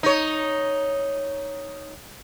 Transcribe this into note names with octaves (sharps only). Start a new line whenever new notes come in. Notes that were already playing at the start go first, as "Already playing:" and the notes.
D#4 C#5